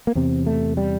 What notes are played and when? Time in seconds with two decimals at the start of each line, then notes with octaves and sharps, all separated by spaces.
0.07 A#3
0.15 E2 C3 C4
0.47 A3
0.77 G3